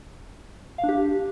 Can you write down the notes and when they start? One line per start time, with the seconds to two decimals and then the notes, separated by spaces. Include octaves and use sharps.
0.78 F5
0.83 D4
0.89 G4